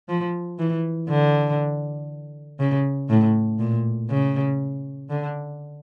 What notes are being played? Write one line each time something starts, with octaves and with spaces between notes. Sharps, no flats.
F3
E3
D3
C#3
A2
A#2
C#3
D3